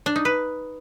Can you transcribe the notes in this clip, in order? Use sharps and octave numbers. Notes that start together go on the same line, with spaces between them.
D4
D#4
B4